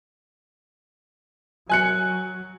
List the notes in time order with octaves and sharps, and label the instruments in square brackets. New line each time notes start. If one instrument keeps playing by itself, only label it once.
[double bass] F#3 [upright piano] G#5 F#6 C#7